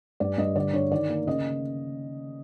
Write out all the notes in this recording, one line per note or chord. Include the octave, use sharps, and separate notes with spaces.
G2 D5
G2 D#5
D3 D5
D3 C#5
D#3 D5
A#3
C#3 D#5